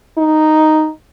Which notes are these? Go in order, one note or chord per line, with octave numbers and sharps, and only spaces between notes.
D#4